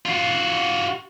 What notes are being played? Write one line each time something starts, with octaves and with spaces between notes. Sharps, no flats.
F4 F#4